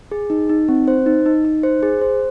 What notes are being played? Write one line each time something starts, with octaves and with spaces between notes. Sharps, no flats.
G#4
D#4
D#4
C4
C5
D#4
D#4
D#4
C5
G#4
C5